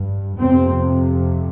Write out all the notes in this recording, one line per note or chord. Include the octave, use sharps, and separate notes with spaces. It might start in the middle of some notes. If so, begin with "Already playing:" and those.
Already playing: G2
F2 C3 C4